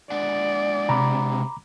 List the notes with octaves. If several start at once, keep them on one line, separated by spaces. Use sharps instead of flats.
G#3 D4 D5 F#5
C3 A#5 B5 D6